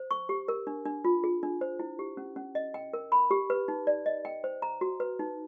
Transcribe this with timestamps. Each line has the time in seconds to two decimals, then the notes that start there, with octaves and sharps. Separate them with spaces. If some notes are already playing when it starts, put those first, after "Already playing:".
Already playing: C5
0.11 C#6
0.29 G4
0.48 A#4
0.67 D4
0.85 D4
1.05 F4
1.24 G#4
1.43 D4
1.61 C5
1.80 E4
1.99 G4
2.17 C#4
2.36 C#4
2.55 D#5
2.74 G5
2.93 A#4
3.12 B5
3.31 G4
3.50 B4
3.68 D#4
3.87 D5
4.06 D#5
4.25 G5
4.44 C5
4.62 A#5
4.81 F#4
5.00 B4
5.19 D#4